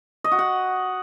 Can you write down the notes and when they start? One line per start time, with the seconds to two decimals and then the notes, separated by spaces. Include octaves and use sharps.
0.24 D#5
0.32 F#4
0.39 F#5